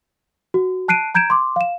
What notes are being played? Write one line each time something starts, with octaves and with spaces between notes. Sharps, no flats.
F#4
A5 F#6 C7 D7 D#7
A#5 G6 G#6 D7 E7
C6 D6
F5 E7